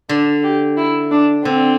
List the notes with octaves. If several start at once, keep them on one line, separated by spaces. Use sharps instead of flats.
D3 D4
G4
E4
D4
D3 C4